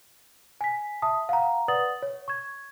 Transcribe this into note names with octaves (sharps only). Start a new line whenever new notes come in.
G#5 B6
E5 A5 D#6
F5 F#5 A#5
B4 D5 F#5 D#6 A6 F#7
C#5
C#6 G#6